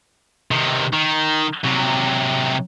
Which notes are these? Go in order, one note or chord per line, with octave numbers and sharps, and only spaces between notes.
C3 D#3
D#3
C3 F#3